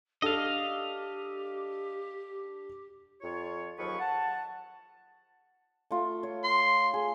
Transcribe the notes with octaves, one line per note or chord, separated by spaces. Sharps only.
D4 G4 A4 D#5 F5
F2 F4 C#5
D#2 F3 F#3 G#4 B4 C#6
F#5 A5
A3 F4
C#5
C6
G#4